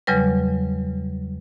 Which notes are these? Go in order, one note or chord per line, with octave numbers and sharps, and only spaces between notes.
E2 C#3 F#3 G3 B4